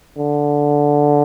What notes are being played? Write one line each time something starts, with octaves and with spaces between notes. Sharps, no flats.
D3